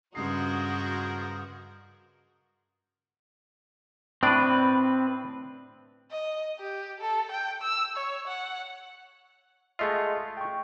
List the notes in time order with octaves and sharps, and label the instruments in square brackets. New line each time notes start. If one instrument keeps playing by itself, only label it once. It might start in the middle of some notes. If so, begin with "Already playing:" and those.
[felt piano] G2 C#3 C7 [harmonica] F3 G#3 A#4 [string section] F#4 [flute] D#6
[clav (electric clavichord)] A2 D4 D5 [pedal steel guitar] C4 B4
[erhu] D#5
G4
A4
G5
E6
C#5
F#5
[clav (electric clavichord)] G#3 A3 F4 [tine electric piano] G#4 D#5 E5
[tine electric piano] G5 C#6